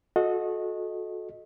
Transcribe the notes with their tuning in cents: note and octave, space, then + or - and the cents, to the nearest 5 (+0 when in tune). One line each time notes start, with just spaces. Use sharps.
F#4 -30 A4 -25 D#5 +0